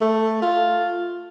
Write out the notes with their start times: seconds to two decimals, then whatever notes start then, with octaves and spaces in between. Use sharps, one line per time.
0.01 A3
0.42 F4